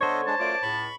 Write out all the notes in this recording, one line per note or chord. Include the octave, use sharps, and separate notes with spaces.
D3 B3 D4 A4 C5 C#5 D#5
G#3 D4 A5
F#2 A3 F4 D5 D6
C#2 A2 B5 C#6